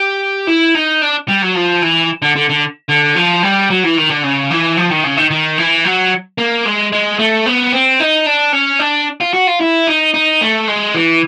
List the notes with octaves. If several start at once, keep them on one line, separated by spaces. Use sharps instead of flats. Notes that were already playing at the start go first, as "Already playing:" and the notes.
Already playing: G4
E4
D#4
D4
G3
F#3
F3
E3
D3
D3
D3
D3
F3
G3
F#3
E3
D#3
D3
C#3
E3
F3
D#3
C#3
D#3
D#3
E3
F#3
A#3
G#3
G#3
A3
B3
C4
D#4
D4
C#4
D4
F4
F#4
F4
E4
D#4
D#4
A3
G#3
E3